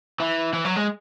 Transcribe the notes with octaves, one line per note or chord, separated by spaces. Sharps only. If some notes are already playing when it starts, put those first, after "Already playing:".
E3
E3
F#3
G#3